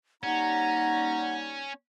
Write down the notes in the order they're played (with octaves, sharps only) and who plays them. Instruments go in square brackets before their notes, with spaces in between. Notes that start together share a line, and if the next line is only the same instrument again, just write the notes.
[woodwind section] G3 A#3 D#4 [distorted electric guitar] C#4 [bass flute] F#5 [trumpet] A#5